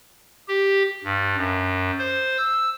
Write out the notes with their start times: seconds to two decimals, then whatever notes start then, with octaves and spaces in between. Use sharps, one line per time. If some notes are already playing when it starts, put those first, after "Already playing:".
0.48 G4
1.04 G2
1.37 F#2
1.99 C5
2.38 E6